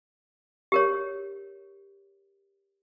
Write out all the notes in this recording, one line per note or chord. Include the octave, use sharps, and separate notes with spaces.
G4 A#4 C#5